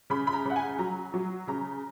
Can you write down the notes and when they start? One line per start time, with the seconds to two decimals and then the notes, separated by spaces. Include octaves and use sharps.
0.10 C#3 B5
0.27 B5
0.33 A#5
0.45 C#3 F#5
0.56 G#5
0.79 F#3 A#5
1.14 F#3
1.48 C#3 A#5